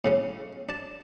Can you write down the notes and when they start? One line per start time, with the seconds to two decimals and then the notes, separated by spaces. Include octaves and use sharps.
0.05 A2 C#3 C#4
0.69 D4 A5